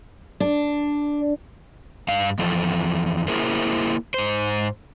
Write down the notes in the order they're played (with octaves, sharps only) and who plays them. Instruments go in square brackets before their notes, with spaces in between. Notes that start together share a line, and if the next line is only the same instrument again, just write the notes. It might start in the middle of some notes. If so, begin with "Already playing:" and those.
[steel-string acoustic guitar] D4
[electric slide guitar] G2 F5
E2 F3 A4
A#3 E4 G#4 A#4 C5
G#2 C5